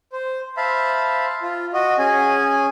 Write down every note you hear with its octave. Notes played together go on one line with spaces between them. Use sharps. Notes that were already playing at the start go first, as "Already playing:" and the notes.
C5
C5 E5 F5 A5 B5
F4
F#4 D#5
C#4 G#4 G#5